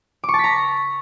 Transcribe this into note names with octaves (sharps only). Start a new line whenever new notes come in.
D6
C#6
A5
B6
A#5